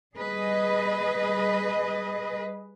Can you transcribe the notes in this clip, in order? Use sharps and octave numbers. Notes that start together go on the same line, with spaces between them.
G3 G#4 B4 D#5